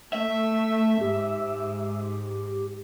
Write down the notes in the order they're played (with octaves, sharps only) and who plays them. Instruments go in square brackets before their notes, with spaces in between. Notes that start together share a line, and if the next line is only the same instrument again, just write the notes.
[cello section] A3 [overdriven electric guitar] E5
[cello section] G#2 [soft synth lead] G4